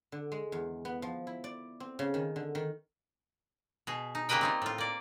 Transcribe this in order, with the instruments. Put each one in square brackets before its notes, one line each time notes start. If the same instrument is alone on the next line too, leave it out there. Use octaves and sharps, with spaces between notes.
[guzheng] D3
G#3
E2
B3
F3
E4
D5
C4
C#3
D#3
D3
D#3
[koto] B2 G#4
D#4
C#3 G3 A#3 B4 D#5 G5
C4 D#4 F4
A2 F4
A#3 D5